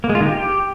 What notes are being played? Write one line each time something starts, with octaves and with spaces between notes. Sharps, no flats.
A#3
G#3
F4
D#3
G4